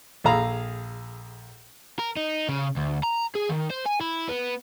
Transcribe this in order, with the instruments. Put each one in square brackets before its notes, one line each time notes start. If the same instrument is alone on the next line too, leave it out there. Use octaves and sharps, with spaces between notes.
[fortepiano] A#1 G#4 A4 F5 A#5 B5
[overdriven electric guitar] A#4
D#4
C#3
D2
A#5
G#4
D#3
C5
G#5
E4
B3